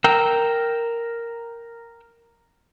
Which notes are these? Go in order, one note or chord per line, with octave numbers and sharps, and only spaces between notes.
A#4 G5 A#5 E6